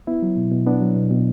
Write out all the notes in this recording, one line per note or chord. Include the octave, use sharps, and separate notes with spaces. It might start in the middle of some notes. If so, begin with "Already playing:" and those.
B3 E4
F#3
B2
B2
B3 D4
F#3
B2
B2